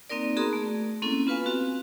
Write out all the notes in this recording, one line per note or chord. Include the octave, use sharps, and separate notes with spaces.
A#3 C4 D#4 A#4 D5
B3 F#4 G#4 A#5 C6 D#6
A3
A#3 C4 C#4 E4 A4
B3 F4 B4 F5 G#5
C4 F#4